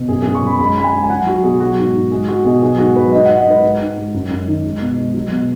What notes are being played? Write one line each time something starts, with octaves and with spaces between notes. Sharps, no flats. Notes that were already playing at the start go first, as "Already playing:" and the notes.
Already playing: B2
F#2 G#4
F#2 G#4
C#6
F#2 B5
G#3 B5
G#3 B5
G#5
G#3
G#5
F#3 F#5
F#3 F#4
B2 G#4
F#3 F#4
G#2
G#2
G#3 G#4
G#3 F#4
B2 G#4
F#3 G#4
G#2 F#4
F#3 B4
G#2 D#5
G#3 F#5
D#5
G#2 B4
G#3
G#2
G#3
F#2
F#2
D#3
G#3
B2
G#3
F#3
B2